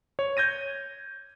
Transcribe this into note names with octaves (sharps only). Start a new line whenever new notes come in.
C#5
G6 G#6 A#6 D#7